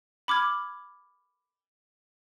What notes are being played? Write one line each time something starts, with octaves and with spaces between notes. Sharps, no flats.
B5 D6 F6 G#6